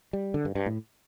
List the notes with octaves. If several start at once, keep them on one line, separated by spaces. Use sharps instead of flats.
G3
D3
G2
G2
A2